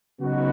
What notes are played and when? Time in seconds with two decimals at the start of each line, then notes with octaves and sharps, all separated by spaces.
0.19 C#3 F#3 B3 D#4 F#4